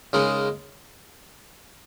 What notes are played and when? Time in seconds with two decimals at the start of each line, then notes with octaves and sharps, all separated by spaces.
0.13 C#3 G#3 D#4 A#4